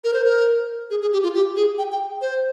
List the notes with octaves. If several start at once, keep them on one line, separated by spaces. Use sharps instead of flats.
A#4
C5
A#4
G#4
G#4
G4
F4
G4
G#4
G5
G5
C5